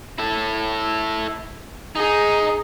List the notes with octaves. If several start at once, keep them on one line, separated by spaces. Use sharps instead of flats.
E4 A4
D#4 G#4